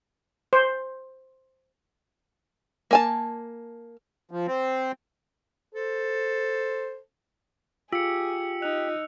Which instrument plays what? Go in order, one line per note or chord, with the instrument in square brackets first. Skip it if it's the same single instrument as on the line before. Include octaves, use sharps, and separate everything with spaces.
[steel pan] C5
[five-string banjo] A#3 G#5 A5
[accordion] F3
C4
[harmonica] A4 C5
[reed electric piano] F4 [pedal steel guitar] G4 [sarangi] G#4 [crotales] E6 C#7
[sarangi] D#4 [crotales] F#6 F7